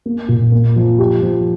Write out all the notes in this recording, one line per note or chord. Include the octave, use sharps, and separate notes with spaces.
A#3
A#2
A#3
F3
G4
F3